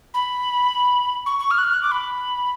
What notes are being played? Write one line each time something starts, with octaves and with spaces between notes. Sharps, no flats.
B5
C#6
C#6
F6
F#6
F6
F#6
D6
B5